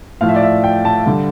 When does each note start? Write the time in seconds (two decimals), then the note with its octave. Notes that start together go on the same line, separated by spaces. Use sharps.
0.21 A2 F3 F5
0.29 E5
0.36 D5
0.43 E5
0.64 G5
0.85 A5
1.06 D3 G3